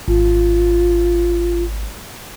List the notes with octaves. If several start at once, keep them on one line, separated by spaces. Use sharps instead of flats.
G#1 F4